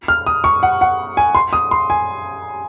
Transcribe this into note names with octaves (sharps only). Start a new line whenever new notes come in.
F6
D#6
C#6
F#5
F#5
G#5
C6
D#6
C6
G#5